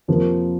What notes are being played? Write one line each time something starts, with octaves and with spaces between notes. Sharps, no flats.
F2 C3 F3 A#3